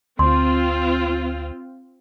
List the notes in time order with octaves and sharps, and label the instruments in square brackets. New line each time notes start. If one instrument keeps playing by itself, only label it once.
[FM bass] D2 [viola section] C4 F4 [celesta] C6